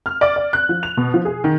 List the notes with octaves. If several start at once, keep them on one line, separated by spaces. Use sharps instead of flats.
F6
D5
D5
F#6
F3
F7
B2
F3
G#4
D#3